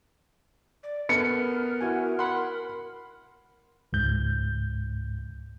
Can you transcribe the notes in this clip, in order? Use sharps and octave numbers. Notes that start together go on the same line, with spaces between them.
D5
B3 A4 A#4 C#7
E4 F#4 G#5
F#5 B5 C6
C#2 G#2 G6